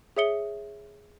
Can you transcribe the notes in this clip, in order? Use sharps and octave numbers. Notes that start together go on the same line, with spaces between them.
G#4 C#5 E5 D#6 C#7 G7